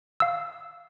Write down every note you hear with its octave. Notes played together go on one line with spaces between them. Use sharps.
F5 E6